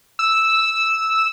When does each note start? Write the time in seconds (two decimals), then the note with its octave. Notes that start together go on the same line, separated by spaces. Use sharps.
0.19 E6